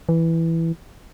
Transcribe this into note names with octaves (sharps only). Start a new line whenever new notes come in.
E3